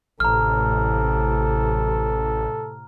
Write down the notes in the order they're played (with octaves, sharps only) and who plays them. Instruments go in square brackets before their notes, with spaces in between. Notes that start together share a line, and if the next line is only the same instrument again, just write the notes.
[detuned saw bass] A1 [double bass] A2 C3 [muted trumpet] A4 [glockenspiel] A#5 F6